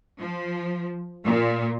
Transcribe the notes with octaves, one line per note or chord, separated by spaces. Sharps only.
F3
A#2